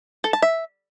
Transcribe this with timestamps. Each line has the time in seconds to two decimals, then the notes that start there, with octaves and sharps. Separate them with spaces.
0.24 A4
0.33 A5
0.42 E5